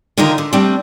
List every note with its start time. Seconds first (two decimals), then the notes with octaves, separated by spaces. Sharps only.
0.18 D3 D#3 D#4 F4 A#4 A#5
0.38 D3
0.53 G3 A3 C4 D4